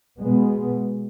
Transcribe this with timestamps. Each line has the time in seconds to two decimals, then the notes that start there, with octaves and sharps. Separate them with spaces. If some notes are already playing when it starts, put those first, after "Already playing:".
0.22 B2 G#3 B3